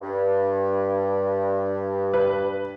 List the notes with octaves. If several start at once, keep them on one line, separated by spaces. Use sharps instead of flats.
G2
B4